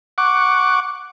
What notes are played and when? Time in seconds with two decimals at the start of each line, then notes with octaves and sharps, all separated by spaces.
0.18 F#5 C#6 D6